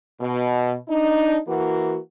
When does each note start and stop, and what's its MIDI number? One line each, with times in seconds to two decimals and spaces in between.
0.20 0.75 47
0.88 1.37 62
0.88 1.37 63
1.48 1.97 52
1.48 1.97 58
1.48 1.97 66